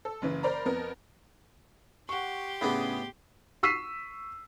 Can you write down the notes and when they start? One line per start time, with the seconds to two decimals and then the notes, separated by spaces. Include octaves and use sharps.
0.05 A4
0.22 F#1 C#3 E3
0.43 A#4 C5 D5 A#5 B5
0.66 F2 B3 A#4
2.09 G4 F#5 C6 C#6
2.61 A2 C#3 B3 D4 G#4 B5
3.63 C#6 E6 B6 C7 D#7